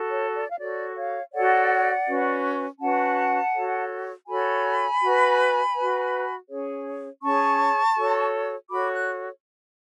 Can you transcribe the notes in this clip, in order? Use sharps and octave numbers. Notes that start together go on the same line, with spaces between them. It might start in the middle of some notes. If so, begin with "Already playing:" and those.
Already playing: F#4 A4
C#5
D5
F5
F#4 A4 C#5 D5
C#5 F5
F#4 A4 C#5 D5 F#5
C#4 F#4 B4
C#4 F#4 B4 F#5 A5
F#4 A4 C#5
F#4 A4 C#5 G#5 B5
F#4 B4
F#4 B4
C#4 G#4 C#5
C#4 G#4 C#5 A5 C#6
F#4 A4 C#5
F#4 A4 C#5 B5 D6
F#6